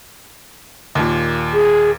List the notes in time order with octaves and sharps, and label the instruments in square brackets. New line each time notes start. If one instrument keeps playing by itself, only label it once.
[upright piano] D#2 A#2
[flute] G#4